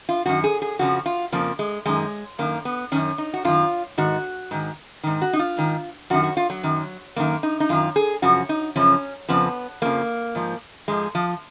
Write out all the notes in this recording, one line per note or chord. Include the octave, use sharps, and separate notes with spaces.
F4
F#2 D#3 F#4
G#4
G#4
F2 C#3 F3 F#4
F4
F2 C#3 F3 A#3
G#3
F#2 D#3 G#3
F#2 D#3 A#3
B3
F#2 D#3 C#4
D#4
F#4
F#2 D#3 F4
G#2 D#3 F#4
G#2 D#3
G#2 D#3
F#4
D#4
F4
G#2 D#3
F#2 D#3 F#4
F#4
F4
F#3
F#2 D#3
F#2 D#3 A#3
D#4
D#4
F#2 D#3 F4
G#4
F#2 C#3 F3 F#4
D#4
F#2 C#3 F3 C#4
F2 C#3 F3 B3
F2 C#3 F3 A#3
G#2 F3
G#2 F3 G#3
F3